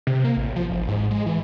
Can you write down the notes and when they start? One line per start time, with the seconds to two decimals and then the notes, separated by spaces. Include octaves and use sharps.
0.07 C3
0.24 A#3
0.37 A1
0.56 F3
0.70 G#1
0.88 G#2
1.11 G#3
1.26 E3